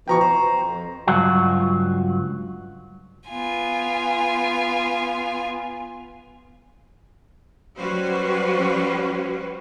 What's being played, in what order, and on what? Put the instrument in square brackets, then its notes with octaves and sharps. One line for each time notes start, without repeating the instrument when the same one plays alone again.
[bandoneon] B2 E3 F3 [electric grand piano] G5 A#5 C#6
[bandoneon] C5 [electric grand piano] A#5
[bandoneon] F2
[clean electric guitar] C#2 G2 F#3 F4 F#4
[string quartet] B3 F4 G#5
[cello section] F#3 G3 C#4 F#4 B4 C5